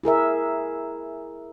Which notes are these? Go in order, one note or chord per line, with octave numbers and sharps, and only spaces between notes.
E4 G#4 A#4 E5